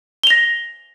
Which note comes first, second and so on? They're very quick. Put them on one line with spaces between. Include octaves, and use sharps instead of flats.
G7 F7 A#6